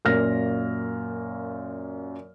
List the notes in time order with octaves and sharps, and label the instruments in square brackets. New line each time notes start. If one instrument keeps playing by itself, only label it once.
[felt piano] F#2 A#2 A#3 F6 A#6